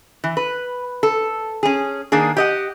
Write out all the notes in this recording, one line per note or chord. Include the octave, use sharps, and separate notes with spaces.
E3
B4
A4
C#4 G#4
D#3 A#3 D4 G#4
G4 D#5 F#5